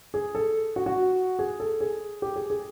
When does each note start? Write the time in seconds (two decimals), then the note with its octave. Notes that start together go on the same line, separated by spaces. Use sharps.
0.14 G#4
0.35 A4
0.76 F#4
0.86 F#4
1.39 G#4
1.60 A4
1.81 G#4
2.22 G4
2.36 G#4
2.50 G#4